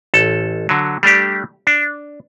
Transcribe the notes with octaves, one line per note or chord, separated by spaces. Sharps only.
A1 A4
D3 F#3
G3 A3 D4 G4
D4